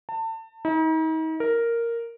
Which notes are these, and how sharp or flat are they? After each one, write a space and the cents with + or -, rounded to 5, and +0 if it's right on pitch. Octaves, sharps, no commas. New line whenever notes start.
A5 +30
D#4 +40
A#4 -5